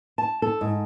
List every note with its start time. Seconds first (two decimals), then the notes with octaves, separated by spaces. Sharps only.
0.18 A5
0.42 A4
0.61 G#2